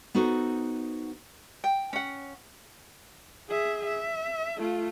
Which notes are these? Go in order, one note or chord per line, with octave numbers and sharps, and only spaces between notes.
B3 D#4 F#4 A4 C5
G5
C#4 F#5
G#4 E5
E5
A3 F4